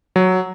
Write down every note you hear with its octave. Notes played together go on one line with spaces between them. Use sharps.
F#3